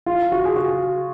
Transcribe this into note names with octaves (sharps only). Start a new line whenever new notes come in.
F4
F#4
G#4
F#4